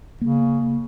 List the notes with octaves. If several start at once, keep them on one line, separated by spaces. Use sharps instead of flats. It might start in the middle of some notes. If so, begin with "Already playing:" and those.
C#3 A#3